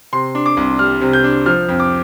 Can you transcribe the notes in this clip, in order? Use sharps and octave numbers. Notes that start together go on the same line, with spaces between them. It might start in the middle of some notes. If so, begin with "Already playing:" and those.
C3 C6
D4
D6
C2
G3 F6
C3
G6
D4
F3 F6
F2
D6